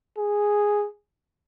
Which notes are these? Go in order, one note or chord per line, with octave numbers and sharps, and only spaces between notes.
G#4